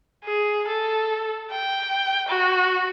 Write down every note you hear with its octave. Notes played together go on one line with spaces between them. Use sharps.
G#4
A4
G5
F#4